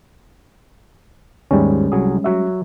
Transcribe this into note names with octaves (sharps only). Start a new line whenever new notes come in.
D#2 G#2 G3 G#3 C#4
C2 F#3 G#4
F#3 F#4 E5